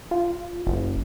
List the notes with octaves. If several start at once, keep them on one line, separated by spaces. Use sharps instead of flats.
F4
F#1